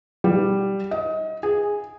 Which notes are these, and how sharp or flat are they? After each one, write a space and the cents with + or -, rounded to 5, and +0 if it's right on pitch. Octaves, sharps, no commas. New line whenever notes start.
G3 +0
D#5 +25
G#4 -10